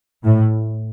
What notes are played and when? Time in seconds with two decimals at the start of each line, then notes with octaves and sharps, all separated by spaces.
0.24 A2